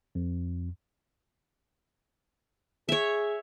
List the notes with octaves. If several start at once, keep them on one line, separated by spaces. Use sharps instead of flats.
F2
G#4 C#5 E5